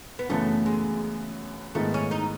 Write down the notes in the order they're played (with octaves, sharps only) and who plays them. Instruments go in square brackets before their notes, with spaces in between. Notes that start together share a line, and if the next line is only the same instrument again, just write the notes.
[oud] B3
[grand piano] F#2 C#3 E3 B3 [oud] A3
[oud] G#3
[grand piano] G#2 D#3 G#3 B3 E4 [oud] A3
[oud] C#4
D#4